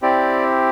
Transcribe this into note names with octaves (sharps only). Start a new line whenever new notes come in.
C4 E4 G4 D5